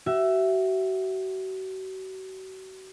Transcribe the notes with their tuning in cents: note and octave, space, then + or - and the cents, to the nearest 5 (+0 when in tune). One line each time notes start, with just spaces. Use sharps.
F#4 +40 E5 +10